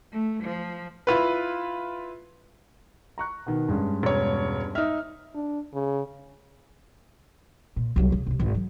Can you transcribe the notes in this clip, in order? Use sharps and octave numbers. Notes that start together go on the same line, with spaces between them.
A3
F3
E4 F4 B4
A#5 C#6 F#6
B2 D#3
G2 G#3 C#4
E1 C#5
D#4 E5 F6
D4
C#3
A#2
C2 F#3
C#3
B1 C3
G#1 C#2
F#3